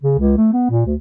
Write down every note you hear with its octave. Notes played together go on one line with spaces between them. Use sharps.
C#3
C#2
A3
B3
A#2
D2